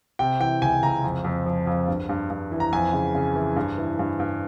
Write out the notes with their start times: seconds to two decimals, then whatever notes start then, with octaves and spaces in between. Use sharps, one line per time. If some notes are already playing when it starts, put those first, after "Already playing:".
0.19 C3 G5
0.40 E3 G5
0.62 C#2 G#5
0.83 C#2 A#5
1.04 F2
1.24 F2
1.46 F3
1.67 F2
1.88 G2
2.09 G2
2.30 G2
2.52 E3
2.60 A#5
2.73 F2 G#5
2.93 C#3
3.15 C#3
3.36 E3
3.56 G2
3.78 E3
3.99 G2
4.20 G2